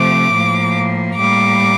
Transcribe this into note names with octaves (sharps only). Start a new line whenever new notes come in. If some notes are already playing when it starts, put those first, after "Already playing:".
Already playing: C3 F3 A3 D6
A2 F3 A#3
A2 G3 A#3 D6